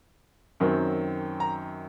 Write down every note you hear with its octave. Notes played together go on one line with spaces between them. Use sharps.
F#2 D#3 F#3 C4
A#5